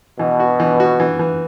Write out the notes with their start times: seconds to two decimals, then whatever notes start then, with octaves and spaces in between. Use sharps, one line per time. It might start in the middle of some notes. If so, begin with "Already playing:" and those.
0.19 B2 E3
0.40 F#4
0.60 E3
0.80 F#4
1.00 E3
1.19 E3